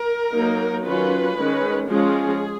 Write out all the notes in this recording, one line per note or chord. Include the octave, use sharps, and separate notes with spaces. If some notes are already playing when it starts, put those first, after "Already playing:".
Already playing: A#4
F#3 A#3 D#4
D#3 F#3 C#4 F4 B4
D#3 G#3 C#4
F3 G#3 C#4 F4 G#4